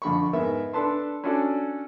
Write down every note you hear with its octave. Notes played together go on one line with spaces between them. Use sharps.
F2 D3 B5 C#6
G#2 B3 A#4 E5
D4 A4 B4 A5 C6
C#4 D4 F#4 A4 D5